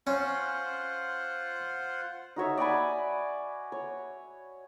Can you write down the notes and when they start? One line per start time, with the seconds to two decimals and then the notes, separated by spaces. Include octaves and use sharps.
0.07 C#4 F4 C5 F#5
2.36 D#4 F#4 C#5 E5
2.57 D5 F#5 G#5 B5
3.72 C#5